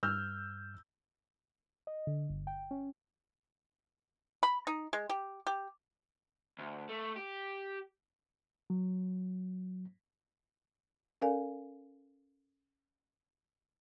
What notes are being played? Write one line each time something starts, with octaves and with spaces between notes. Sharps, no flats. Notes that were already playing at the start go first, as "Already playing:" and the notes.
G2 E6 F6 G6
D#5
D3
G1
G5
C#4
B5
D#4
G#3
G4
G4
D2
A3
G4
F#3
C#4 A4 A#4 D5 F5 G#5